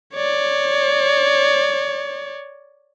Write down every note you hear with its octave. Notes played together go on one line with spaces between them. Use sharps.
C#5 D5